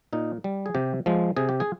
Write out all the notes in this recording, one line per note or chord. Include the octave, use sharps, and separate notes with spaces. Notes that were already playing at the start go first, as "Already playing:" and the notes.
A#2 D#4
G3
G#4
C3 G4
F3 G#3
C3 G#4
G4
G#4